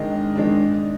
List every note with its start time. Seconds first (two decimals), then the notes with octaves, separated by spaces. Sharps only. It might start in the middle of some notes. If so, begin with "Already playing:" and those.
Already playing: G#2 D#3 G#3 D4 D#5
0.11 G#2
0.36 D#3 G#3 D4
0.59 G#2